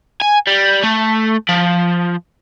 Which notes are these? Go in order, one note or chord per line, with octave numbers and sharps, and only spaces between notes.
G#5
G3
A3
F3